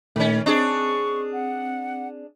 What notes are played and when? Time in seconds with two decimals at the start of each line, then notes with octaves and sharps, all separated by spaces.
0.16 A#2 D#3 A3 C#4
0.46 C4 D4 G#4 C#6
1.33 F#5